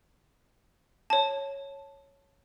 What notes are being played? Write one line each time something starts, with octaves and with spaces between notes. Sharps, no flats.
C#5 A5